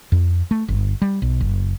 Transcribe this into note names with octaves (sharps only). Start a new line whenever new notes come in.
F2
A3
G1
G3
B1
F#1